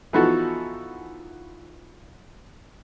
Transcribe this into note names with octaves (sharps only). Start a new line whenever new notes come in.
E3 F3 B3 D#4 F#4 A4